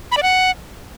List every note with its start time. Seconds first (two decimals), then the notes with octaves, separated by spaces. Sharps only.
0.12 B5
0.17 D5
0.23 F#5